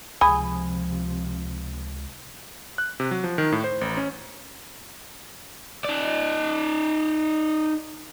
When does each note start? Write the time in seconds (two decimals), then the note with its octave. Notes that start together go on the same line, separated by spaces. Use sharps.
0.21 C#2 C3 F3 G#4 B5
2.78 F#6
3.00 C3
3.11 F#3
3.24 F3
3.38 D#3
3.52 A2
3.64 C5
3.81 A1
3.97 C#4
5.85 D#4 D5